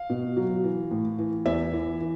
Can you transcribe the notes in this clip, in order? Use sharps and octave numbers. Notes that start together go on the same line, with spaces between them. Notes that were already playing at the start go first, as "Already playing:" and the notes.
Already playing: F5
B2
F#3
E3
A2
E3
E2 E5
E3
E3